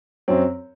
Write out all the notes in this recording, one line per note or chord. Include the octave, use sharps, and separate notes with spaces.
F#2 F#3 C4